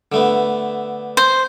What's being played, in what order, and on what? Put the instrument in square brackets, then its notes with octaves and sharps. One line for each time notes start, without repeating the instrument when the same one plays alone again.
[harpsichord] D3 A3 B3
[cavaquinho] C5